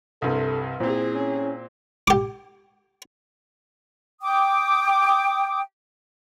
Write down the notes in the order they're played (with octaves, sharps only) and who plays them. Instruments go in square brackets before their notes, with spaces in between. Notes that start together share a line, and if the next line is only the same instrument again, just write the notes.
[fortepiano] C2 G2 C3 [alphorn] A4
[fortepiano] A#2 C4 [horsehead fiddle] E4 G#4 [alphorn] C5
[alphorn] C#4
[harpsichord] G4 D6
[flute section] G5 D6 D#6